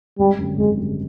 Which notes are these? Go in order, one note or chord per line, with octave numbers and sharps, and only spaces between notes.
G#1 G3
F#2 D3 G3
G#1 G#3
F#2 D3 G3